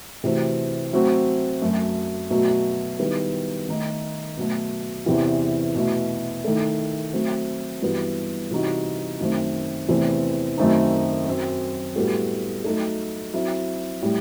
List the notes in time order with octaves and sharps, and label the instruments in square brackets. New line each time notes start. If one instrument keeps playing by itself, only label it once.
[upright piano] C3 E3 A3 C4 F#4
F#3 A3 C4 F#4
F#2 F#3 A3
B2 F#3 A3
D#3 G3 B3 E4
D#3 A3 D#4
B2 F#3 A3
E2 C3 E3
B2 A3 E4
D#3 A3 E4 A4
F#3 A3 C4
G2 E3 G3 B3 F#4
C3 E3 G3 D#4 F#4
F#2 D#3 A3 C4
E2 C3 E3 A3 C4
F#2 D#3 A3 C4 D#4
F#2 F#3 C4
A2 G3 B3 F#4 A4
F#3 A3 D#4 A4
F#3 C4 E4
A2 G3